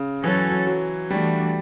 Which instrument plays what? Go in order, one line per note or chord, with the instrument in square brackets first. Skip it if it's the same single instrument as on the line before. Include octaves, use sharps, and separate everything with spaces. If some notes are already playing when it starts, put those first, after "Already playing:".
Already playing: [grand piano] C#3
[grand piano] E3 [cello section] F#3 C#4 F#4 A4
[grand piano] F#3
[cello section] E3 A3 D4 F#4 [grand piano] G3